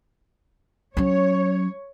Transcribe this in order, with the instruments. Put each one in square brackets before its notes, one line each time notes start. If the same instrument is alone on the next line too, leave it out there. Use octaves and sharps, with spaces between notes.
[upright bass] F#3 C#4 [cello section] C#5